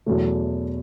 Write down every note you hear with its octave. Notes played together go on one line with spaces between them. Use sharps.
E2 B2 F#3 A3